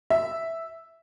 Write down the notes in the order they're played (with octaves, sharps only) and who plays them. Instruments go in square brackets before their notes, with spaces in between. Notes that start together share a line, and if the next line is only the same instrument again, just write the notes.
[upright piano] E5